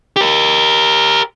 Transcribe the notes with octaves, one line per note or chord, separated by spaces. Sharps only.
G4 A#4